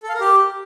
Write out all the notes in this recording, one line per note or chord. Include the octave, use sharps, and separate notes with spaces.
A4
F5
A#4
G4